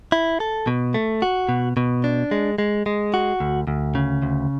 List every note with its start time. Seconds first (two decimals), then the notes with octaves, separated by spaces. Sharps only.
0.12 E4
0.40 A4
0.67 B2
0.94 A3
1.22 F#4
1.49 B2
1.77 B2
2.04 D4
2.31 G#3
2.58 G#3
2.86 G#3
3.14 F#4
3.40 D2
3.67 D2
3.95 C#3
4.22 D2